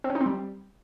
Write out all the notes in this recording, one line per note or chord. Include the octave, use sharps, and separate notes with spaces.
C4
C#4
D#4
C4
G3